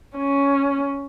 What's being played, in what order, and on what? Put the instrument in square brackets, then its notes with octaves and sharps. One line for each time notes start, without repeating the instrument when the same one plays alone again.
[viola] C#4